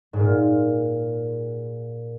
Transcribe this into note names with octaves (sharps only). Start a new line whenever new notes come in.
G#2
A#2